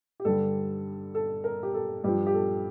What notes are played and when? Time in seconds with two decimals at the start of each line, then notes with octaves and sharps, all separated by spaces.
0.20 G4
0.25 G2 D3 G3 A4
1.15 A4
1.44 A#4
1.63 G4
1.74 A4
2.04 G2 F3 G4
2.27 G4
2.34 A4